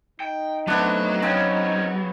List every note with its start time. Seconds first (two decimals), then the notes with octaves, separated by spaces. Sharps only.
0.20 D#4 G5
0.67 F#3 A3 B3 C4 D4
1.22 C#3 C4 C#4 G5